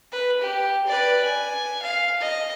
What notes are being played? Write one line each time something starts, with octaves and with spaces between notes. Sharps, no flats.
B4
G4
B4 D5
G#5
F5
D#5